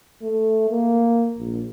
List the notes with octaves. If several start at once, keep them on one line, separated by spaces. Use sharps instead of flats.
A3
A#3
A#1